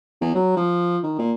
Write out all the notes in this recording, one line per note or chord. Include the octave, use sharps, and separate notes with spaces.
E2
F#3
F3
D#3
A#2